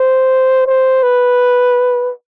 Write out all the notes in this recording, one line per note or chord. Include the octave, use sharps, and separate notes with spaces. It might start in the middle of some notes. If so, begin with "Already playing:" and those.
Already playing: C5
C5
B4